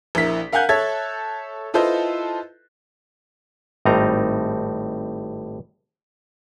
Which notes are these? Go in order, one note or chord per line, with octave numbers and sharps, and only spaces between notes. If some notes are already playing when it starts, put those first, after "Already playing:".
A#1 E4 A#4 B6
A#4 F5 F#5 G#5 F#6 G6
A4 C#5 E5 G#6 A6
E4 F4 A4 B4 C5 D#5
G#1 A2 G3 C4 D#4 A#5